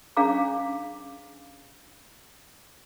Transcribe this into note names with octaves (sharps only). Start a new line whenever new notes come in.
C#4 D4 G#4 F5 A#5 D6